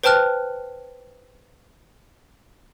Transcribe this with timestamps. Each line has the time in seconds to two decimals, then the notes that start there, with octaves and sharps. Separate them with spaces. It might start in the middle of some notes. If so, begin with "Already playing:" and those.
0.03 B4 C5 G5 A5 F6 F#6